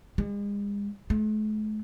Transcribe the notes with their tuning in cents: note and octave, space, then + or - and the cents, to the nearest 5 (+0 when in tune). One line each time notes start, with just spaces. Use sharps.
G#3 -40
A3 -45